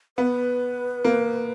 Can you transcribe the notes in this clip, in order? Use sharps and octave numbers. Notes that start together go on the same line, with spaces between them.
B3 B4
A#3